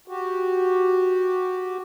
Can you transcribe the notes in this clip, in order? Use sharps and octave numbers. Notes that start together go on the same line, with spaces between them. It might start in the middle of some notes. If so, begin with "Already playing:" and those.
F#4 G4